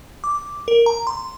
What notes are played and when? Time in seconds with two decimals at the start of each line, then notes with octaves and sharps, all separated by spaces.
0.24 D6
0.68 A#4
0.86 A#5
1.07 C6